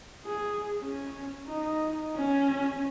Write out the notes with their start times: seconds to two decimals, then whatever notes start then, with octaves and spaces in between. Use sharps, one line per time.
0.25 G#4
0.80 C#4
1.47 D#4
2.16 C#4